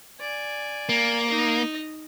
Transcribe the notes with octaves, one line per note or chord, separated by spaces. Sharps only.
D5 G#5
A#3
D#4 D#5